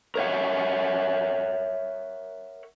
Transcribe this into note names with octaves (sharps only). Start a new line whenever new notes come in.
A#4 C#5 E5 F#5